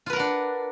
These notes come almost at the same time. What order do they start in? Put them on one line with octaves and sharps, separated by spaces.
F4 B4 A#4 F#5 D4